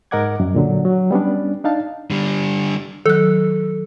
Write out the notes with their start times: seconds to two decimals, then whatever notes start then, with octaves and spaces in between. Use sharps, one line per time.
0.11 G#2 A#4 D#5 F#5 D6 G#6
0.40 F#2
0.55 A#2 D3 F#3
0.85 F#3
1.11 G3 B3 C#4 D4
1.64 D4 D#4 F5 A5
2.10 D3 G3
3.06 D#3 F#3 A4 F#6